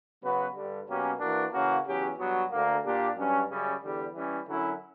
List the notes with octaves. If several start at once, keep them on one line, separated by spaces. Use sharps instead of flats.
C#3 F#3 B3 F#4 B4
G2 D3 G3
B2 F#3 A#3 C#4 G4
E3 A#3 D4 F#4 A#4
C#3 E3 A#3 C#4 F#4
E2 C#3 F#3 C#4 G4
G2 F#3 B3 F#4
D2 D3 A#3
A#2 A#3 D4 G4
G2 F#3 C#4
F#2 C#3 G3 C#4
E2 D3 G3
E3 G3 C#4
F#2 D3 F#3 C#4 E4